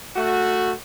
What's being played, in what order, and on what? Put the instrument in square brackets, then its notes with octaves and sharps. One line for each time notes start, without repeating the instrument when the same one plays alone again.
[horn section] A3 F#4